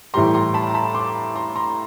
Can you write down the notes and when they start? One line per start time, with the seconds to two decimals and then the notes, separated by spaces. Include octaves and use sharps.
0.14 A2 E3 G3 A#5 C6
0.34 A#5 C6
0.54 A5 B5
0.70 A#5
0.74 A5 B5
0.94 C6 D6
1.35 A#5 C6
1.56 A#5 C6